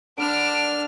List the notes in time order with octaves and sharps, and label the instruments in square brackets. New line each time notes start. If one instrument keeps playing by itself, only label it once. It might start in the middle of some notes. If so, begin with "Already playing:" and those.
[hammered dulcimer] D3 B5 [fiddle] D4 F6 [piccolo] D7